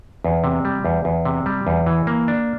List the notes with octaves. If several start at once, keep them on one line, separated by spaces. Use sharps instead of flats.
E2
C3
G3
E2
E2
C3
G3
E2
E3
A#3
D4